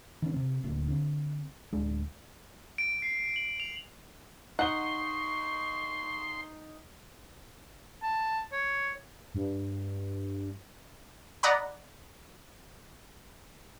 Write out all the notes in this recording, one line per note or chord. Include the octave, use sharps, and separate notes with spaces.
D#3 B3 C#4
C3 C4
D1 D2 A#3
D3 C4
D1 G#3 D4
D7
C7
F#7
F7
D#4 F#5 C6 C#6 G7
A5
C#5
G2
D5 D#5 F#5 A#5 B5